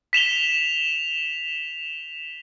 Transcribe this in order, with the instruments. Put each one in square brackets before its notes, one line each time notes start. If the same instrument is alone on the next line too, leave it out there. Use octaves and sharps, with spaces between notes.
[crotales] B6 E7 F7 G7